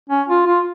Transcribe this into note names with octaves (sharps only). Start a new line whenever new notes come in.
C#4
F4
F4